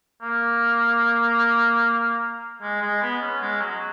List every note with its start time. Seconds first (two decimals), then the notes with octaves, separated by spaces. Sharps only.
0.22 A#3
2.62 G#3
2.82 G#3
3.02 B3
3.22 C#4
3.42 G#3
3.61 F#3